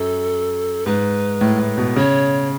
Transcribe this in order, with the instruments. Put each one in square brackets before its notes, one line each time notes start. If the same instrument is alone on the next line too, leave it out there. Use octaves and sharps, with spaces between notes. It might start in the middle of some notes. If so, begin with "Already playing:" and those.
Already playing: [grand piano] F#2 [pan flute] A4
[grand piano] G#2 [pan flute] B4
[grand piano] A2
A2
B2
[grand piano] C#3 [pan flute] C#5